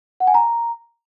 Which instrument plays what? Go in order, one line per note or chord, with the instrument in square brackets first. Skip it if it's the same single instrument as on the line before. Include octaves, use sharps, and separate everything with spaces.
[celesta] F#5
G#5
A#5